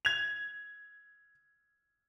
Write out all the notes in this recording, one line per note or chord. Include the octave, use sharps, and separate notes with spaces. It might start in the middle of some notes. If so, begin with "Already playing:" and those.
G#6 F7